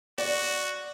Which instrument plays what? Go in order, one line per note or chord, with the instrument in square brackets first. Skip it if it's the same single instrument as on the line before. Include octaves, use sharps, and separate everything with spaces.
[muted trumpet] F#4 [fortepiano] D5